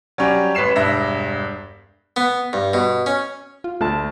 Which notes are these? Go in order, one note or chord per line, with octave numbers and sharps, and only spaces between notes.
F#3 G3 C#4 G4
A1 B4 B6 C7 E7
E1 G2 D4 E5 A#6
B3
G2
B2
C#4
F4
D2 A3 A5